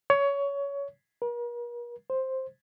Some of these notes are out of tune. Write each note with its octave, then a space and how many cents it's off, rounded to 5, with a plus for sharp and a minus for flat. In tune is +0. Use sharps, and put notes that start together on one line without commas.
C#5 +20
A#4 +45
C5 +5